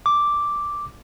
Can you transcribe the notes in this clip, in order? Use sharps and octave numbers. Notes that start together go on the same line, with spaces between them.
D6